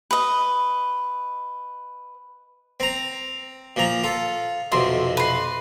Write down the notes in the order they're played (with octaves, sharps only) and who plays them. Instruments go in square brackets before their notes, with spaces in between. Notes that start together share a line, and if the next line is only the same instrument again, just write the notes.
[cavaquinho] B4 D#5
[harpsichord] C4 A#5
A#2 F3 A#5
F4 A4
[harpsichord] B1 F2 C3 [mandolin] C6
[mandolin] B4 C6